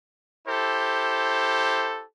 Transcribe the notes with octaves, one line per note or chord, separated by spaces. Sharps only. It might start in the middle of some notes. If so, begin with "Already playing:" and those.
E4 G4 A4 C5